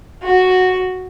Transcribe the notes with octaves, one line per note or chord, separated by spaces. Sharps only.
F#4